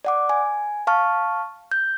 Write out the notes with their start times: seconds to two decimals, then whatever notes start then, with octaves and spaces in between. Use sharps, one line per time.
0.05 D5 F#5 D6
0.29 G#5
0.87 F5 A5 C#6 F6
1.71 G6